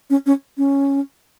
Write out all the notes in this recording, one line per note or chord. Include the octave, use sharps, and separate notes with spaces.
C#4
C#4
C#4